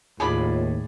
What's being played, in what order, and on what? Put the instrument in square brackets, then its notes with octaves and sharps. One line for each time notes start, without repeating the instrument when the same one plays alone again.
[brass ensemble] D#2 [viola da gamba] A2 [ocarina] F4 [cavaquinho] G#4 D5 B5